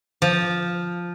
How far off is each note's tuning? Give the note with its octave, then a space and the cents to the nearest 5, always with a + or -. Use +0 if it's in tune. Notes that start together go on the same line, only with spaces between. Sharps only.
F3 +5